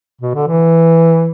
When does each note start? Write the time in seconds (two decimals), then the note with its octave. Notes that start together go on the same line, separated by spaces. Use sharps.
0.21 B2
0.35 D3
0.47 E3